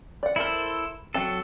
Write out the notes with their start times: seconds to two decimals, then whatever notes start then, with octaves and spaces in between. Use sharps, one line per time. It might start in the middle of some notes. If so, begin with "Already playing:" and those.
0.23 D5 F#5
0.36 E4 A4 A#4 C5 E5
1.14 F#3 C4 A4 F#5